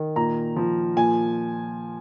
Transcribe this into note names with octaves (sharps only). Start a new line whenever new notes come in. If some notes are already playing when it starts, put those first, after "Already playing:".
Already playing: D#3
A#2 A#5
F3
A#2 G#5